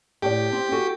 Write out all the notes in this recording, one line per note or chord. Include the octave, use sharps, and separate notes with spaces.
A2 G4 D5
C4
F#4 A4 G#5